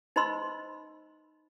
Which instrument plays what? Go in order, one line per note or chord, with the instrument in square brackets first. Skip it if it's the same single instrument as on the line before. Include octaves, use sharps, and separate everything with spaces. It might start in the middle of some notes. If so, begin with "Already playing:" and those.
[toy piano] D#4 C5 D#5 B5 C6 E6